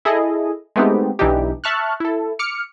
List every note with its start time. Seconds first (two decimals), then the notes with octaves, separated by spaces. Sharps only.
0.05 E4 G#4 A4 D#5
0.76 G#3 A3 B3 C4 D#4 G4
1.19 B1 E3 D4 D#4 G4
1.64 E5 A5 C#6 F6 F#6
2.00 E4 A4
2.39 D6 F6 C#7